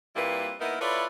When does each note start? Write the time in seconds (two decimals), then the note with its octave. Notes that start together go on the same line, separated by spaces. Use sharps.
0.16 A#2 G3 A#3 C4 E4 B4
0.61 A#3 B3 D#4 E4 A#4
0.81 E4 F4 A4 B4 C#5 D5